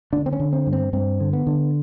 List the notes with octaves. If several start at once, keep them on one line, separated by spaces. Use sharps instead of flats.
D3 D4
C4
C#4
D3
C4
G2
C4
G2 C4
D3
B3
D3